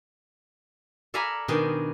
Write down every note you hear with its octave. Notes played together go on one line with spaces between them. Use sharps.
A4 D5 F5 G#5 A#5 B5
B2 D#3 D4 G#4 G5